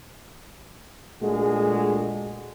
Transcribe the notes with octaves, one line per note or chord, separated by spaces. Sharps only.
A#2 G#3 A3 D4 F#4 G#4